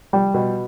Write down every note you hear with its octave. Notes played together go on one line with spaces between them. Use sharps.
G3
B2